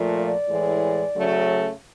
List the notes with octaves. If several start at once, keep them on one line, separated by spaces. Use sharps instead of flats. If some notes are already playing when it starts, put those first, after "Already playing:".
Already playing: A#2 F3 A3
D5
A2 E3 G#3
C#3 F#3 A3